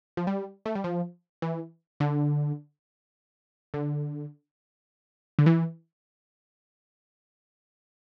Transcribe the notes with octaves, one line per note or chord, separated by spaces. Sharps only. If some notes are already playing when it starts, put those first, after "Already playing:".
F3
G3
A3
G3
F3
E3
D3
D3
D3
E3